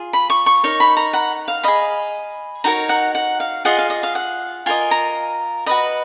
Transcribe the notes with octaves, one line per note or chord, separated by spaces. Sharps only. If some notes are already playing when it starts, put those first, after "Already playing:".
Already playing: F4 G#4
B5
C#6
C#6
D#4 A#4 C#5 C#6
B5
A#5
F#5
F5
G#4 D#5 B5
D#4 F#4 A#4 C#5 A#5
F#5
F#5
F5
F4 G#4 D#5 F#5
F5
D#5
F5
F#5
F4 A#4 D#5 G#5
A#5
F#4 B4 D#5 B5